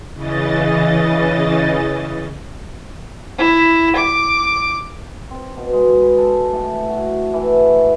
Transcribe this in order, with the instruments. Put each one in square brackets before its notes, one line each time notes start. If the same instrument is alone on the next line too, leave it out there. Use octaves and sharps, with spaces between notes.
[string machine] C#3 E3 D#5 A6
[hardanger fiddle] E4
D6
[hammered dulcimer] C4
B2
G#3
B4
A4
A2
F#4
E3
B4